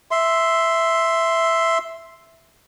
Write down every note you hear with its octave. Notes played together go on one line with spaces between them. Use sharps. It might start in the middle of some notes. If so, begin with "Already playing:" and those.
E5 C6